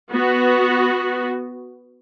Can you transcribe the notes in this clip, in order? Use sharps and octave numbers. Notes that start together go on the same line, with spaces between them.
B3 F#4